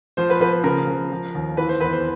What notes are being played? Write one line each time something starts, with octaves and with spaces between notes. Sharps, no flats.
F3 C5
B4
F3 B4
C#3 A#4
F3
F3
D#2
E3 B4
C5
E2 B4
C5